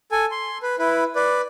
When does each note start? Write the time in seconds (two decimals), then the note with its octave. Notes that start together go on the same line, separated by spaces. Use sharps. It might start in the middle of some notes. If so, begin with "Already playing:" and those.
0.12 A4 G#5
0.31 C6
0.62 B4
0.79 E4 B4
1.16 B4 D5